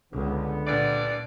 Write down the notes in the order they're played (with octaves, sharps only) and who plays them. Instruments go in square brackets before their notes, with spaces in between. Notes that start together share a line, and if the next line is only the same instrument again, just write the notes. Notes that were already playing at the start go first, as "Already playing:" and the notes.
[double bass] C#2 [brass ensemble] D3 B3
[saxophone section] G2 E3 D5 [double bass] A#2 D4